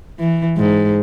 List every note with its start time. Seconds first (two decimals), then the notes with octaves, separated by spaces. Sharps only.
0.19 E3
0.57 G#2